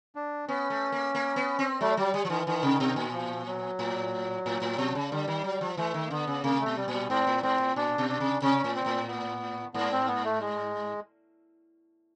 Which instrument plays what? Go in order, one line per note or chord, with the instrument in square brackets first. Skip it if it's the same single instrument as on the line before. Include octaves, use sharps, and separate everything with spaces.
[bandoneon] D4
[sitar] B3 [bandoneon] C#4
[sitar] A3
A#3
A#3
B3
C4
[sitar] F#3 [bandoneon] A3
[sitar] F#3 [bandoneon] G3
[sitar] G3
F3
[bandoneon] D#3 [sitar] E3
[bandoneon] D#3 [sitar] E3
[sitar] C3
B2
A#2
[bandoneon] F3
F#3
[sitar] A2
A2
A2
B2
C#3
[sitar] D3 [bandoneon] G3
[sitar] D#3
F#3
F3
[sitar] E3 [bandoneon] A3
[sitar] D#3
[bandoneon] A#3
[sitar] D3 [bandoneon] B3
[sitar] C#3
[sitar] C3 [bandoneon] A#3
[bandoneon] A3
[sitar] B2
[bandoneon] G3
[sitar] A#2
[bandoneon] G3
[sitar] G#2 [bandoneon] C4
[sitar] A2
[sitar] G#2 [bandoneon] C4
[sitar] A2
[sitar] A#2 [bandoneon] D4
[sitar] B2
[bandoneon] D4
[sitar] C3
[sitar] C3 [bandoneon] C#4
[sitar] A2
[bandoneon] C4
[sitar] A2
[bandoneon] B3
[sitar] G#2 [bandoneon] B3
[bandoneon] C4
B3
A3
G#3